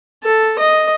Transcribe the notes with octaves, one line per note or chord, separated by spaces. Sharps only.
A4
D#5